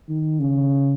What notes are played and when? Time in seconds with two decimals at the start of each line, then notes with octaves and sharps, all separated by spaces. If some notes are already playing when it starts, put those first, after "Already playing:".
0.09 D#3
0.40 C#3